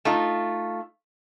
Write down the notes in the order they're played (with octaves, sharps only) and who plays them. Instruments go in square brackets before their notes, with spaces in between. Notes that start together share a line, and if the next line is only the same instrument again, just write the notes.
[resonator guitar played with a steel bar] A3 D#4 F4